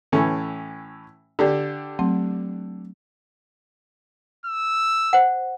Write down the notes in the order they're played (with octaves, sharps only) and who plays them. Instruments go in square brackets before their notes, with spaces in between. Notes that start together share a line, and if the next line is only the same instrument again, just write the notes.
[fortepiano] A2 E3 C#4
D3 D4 G4
[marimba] F#3 A3 C4
[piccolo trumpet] E6
[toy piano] C5 F#5